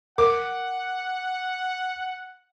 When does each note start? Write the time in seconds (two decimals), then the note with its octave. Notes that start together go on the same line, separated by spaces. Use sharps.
0.18 A#4 F#5 D6